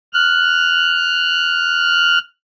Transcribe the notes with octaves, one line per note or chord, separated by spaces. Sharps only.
F6 F#6